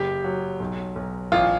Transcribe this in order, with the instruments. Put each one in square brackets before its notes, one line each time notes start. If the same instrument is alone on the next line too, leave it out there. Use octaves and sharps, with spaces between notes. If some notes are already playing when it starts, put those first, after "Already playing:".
Already playing: [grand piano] F#1 G4
F#3
B1
B1
A1 F4